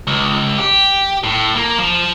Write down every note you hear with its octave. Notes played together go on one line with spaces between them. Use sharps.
C#2
G4
A2
A#3
F3